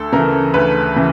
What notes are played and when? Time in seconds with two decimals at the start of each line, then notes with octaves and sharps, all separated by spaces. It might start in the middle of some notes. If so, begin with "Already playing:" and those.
Already playing: D2 A4
0.12 C#3 E3 A#4
0.54 D2 B4
0.96 C#3 E3